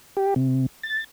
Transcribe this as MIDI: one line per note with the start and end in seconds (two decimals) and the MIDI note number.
0.17 0.34 67
0.36 0.66 48
0.83 1.04 93